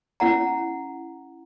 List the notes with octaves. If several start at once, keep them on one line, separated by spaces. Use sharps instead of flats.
C#4 E4 F#5 A#5